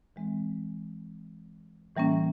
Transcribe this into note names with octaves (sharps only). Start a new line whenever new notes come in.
E3 G#3 C4
A2 E3 G3 A#3 C#4